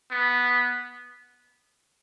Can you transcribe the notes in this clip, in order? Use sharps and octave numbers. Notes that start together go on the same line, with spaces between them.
B3